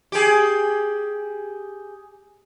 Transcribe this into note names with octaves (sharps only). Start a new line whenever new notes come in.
G4 G#4